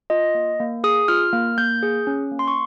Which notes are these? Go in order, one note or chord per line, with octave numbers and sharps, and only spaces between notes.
F4 D#5
A#3
A#3
G#4 D#6
F4 F6
A#3
A#3 G6
G#4
C#4
A#3
C6
C#6